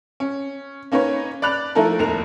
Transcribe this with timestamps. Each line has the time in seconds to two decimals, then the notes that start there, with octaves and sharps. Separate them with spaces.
0.20 C#4
0.92 A#3 C#4 D#4 B4 C#5
1.42 D5 B5 F#6 F7
1.75 F3 A3 D#4 E4 A4 A#4
1.99 F1 D#2 A#4 F7